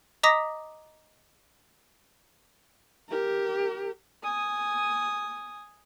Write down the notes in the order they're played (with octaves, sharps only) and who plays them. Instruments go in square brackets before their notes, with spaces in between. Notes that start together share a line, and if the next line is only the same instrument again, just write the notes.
[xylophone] D#5 A#5 D6 D#6 A#6 B6
[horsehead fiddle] G4 A#4
[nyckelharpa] G#5 D#6